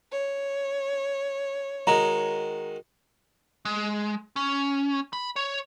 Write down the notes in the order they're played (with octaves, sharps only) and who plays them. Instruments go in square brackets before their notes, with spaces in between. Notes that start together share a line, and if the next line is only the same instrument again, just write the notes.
[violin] C#5
[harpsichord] D#3 G#3 F#4 [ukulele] A#5
[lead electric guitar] G#3
C#4
B5
C#5